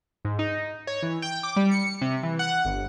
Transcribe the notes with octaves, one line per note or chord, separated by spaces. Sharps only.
G#2
D#4
C#5
E3
G5
D6
G3
C#7
C3
E3
F#5
G1